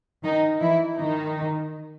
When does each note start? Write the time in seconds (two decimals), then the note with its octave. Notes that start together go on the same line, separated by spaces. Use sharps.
0.23 D#3 D#4
0.60 E3 E4
0.97 D#3 D#4